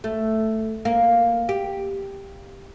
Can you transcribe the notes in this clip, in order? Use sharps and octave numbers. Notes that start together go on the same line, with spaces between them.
A3
A#3
G4